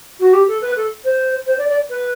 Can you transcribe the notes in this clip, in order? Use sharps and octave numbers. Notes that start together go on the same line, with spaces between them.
F#4
G4
A4
B4
A4
C5
C5
D5
D5
B4